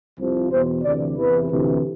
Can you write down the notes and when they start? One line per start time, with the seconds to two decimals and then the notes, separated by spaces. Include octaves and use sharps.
0.17 C2 C3 F3
0.50 E2 B2 C5
0.83 D2 C3 E3 D5
1.17 E2 C3 E3 B4
1.50 D2 C3 E3